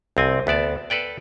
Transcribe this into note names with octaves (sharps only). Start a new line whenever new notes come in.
C2 C4 G#5
D2 B3 D5 A5
A4 B4 D5 G5